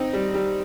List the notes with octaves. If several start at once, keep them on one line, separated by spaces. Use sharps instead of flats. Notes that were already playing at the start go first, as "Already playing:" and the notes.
Already playing: C4 D#4
G3
G3